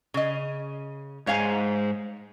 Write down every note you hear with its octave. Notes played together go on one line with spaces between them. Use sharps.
C#3 D#5
G#2 C#5 F5 G#5